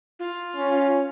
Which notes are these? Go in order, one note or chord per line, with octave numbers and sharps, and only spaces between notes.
F4
C#4